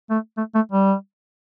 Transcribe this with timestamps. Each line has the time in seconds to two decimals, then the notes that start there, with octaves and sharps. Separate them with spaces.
0.10 A3
0.37 A3
0.55 A3
0.72 G3